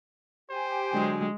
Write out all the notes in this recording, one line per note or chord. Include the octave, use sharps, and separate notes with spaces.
G4 C5 G#5
D3 F#3 G#3